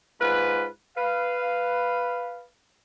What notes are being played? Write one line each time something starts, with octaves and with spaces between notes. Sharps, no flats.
G#2 F4 B4
B4 F5